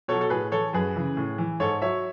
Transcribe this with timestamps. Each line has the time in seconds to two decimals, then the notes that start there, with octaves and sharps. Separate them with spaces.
0.08 B2 A4 C#5
0.13 F#3
0.21 A4
0.30 A2 G#4 B4
0.52 E3 A4 C#5
0.73 F#2 G#4 B4
0.95 C#3 E3
1.17 A2
1.38 E3
1.60 G#2 A4 C#5
1.82 F#3 C#5 E5